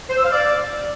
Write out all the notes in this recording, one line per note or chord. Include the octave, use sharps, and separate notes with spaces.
C5
E6
F5
D5